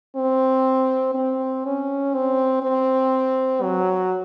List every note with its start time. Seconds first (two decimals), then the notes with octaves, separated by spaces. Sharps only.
0.16 C4
1.15 C4
1.65 C#4
2.14 C4
2.63 C4
3.63 F#3